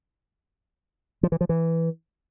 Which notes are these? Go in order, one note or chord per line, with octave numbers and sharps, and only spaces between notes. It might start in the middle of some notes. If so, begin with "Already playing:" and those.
F3
E3
F3
E3